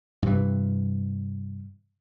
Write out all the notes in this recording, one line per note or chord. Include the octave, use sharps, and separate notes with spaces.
G2 C3 E3